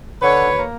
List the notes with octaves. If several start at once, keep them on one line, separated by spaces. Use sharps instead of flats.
D3 B4 C#5
D#2
A#3